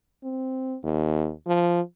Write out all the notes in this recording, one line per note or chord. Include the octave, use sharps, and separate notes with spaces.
C4
D#2
F3